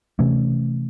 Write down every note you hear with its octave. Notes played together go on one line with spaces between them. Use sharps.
C3 E3 A3 C#4